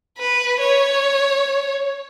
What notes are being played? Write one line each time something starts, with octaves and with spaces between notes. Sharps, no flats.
B4
C#5